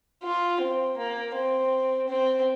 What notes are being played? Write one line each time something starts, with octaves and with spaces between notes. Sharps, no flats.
F4
C4
A#3
C4
C4